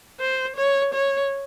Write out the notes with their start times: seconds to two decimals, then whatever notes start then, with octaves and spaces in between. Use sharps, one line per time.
0.20 C5
0.57 C#5
0.94 C#5